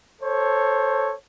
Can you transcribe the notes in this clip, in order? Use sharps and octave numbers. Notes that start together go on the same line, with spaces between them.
A4 C5 C#5